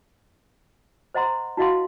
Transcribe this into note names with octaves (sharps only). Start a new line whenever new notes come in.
C5 D#5 F#5 A#5 C6
E4 F#4 D#5 F5 F#5 C6